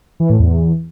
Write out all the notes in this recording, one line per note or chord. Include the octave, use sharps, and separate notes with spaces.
E3
A2
E2